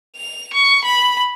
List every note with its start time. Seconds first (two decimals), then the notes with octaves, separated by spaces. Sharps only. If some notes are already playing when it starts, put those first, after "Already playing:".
0.16 F7
0.54 C#6
0.84 B5